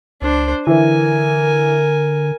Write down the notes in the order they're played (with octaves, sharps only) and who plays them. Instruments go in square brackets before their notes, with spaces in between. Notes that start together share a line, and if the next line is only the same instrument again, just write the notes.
[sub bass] C#2 [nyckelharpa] D4 C5
[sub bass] D3 [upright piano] E3 [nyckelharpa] A#4 G#5